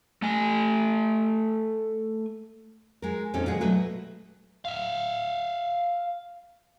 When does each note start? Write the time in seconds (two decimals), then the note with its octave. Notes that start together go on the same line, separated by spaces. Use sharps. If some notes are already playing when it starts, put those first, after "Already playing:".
0.22 A3 G#5
3.02 G#3 A#4
3.33 E2 A#2 C4 C#4 D#4 A4
3.46 D#2 A#2 G#3 G#4 F#5
3.61 B2 F#3 A3 B4 E5
4.65 E5 F5